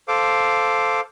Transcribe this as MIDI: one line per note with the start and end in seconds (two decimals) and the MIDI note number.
0.08 1.01 69
0.08 1.01 72
0.08 1.01 77
0.08 1.01 86